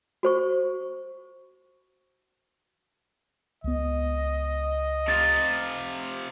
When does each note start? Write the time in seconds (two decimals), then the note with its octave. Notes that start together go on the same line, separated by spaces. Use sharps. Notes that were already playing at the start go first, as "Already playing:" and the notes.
0.23 F#4 C5 C#6
3.64 C#2 B3 D#5
5.08 C3 F4 A6